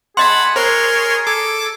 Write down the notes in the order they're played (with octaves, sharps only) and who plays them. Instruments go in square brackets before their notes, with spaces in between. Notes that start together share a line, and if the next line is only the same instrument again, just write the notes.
[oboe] G#4 [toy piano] D#5 C6 [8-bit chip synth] F#5 A5 B5
[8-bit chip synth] A#4 C#5 C6 [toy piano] C5
[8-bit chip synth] A4 D6